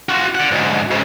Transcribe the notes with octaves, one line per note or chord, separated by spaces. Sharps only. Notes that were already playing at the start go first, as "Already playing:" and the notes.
F4 F#4
D5 F#5
D2 G#2
G#2 C#3